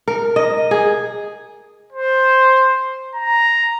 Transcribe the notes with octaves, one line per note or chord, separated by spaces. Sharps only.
A#4
D#5
G#4
C5
A#5